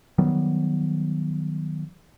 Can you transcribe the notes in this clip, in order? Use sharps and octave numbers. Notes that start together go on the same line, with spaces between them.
D#3 F#3 G3 B3